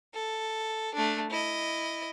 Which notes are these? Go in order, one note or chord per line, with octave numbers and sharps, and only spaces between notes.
A4
A3 D4
E4 D#5